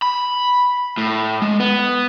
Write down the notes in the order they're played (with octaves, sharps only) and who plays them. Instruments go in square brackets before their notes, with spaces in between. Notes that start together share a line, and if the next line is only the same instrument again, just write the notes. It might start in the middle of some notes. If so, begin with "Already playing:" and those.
[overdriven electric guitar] B5
A2
G#3
B3